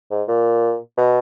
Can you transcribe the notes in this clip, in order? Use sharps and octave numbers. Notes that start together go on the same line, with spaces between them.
G#2
A#2
B2